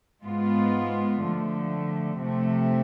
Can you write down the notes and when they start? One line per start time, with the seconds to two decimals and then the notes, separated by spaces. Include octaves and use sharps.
0.24 G#2 G#3 B3 F4
1.22 D3 F3 A3
2.20 C3 F3 A3